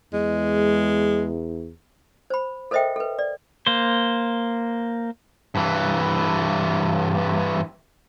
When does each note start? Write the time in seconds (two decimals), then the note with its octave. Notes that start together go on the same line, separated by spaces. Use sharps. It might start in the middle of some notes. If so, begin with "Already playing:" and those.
0.13 E2 G#3
2.30 C5 B5
2.71 A4 A#4 C5 D#5 E5 G5
2.96 A4 B4
3.19 D5
3.67 A#3 C5
5.55 G2 E3